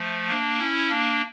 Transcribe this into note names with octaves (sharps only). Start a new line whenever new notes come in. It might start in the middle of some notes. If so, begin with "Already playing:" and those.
Already playing: F3 A3
A#3 D4
C#4 E4
A#3 D4